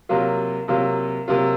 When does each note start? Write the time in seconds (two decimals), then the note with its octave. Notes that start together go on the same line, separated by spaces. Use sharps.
0.09 C3 F#3 A#3 F4
0.68 C3 F#3 A#3 F4
1.28 C3 F#3 A#3 F4